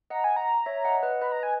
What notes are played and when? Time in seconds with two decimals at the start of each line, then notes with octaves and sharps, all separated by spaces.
0.10 D#5 F#5 A#5
0.24 G#5
0.36 A#5
0.66 C#5 E5
0.85 D#5 F#5
1.03 B4 D#5
1.21 B4 D#5 B5
1.32 A#5
1.43 G#5